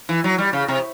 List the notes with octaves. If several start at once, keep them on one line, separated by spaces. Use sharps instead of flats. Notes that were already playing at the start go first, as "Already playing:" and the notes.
E3
F#3
G3
C#3
C3